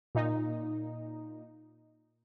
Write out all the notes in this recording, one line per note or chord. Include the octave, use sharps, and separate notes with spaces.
A#2 D#4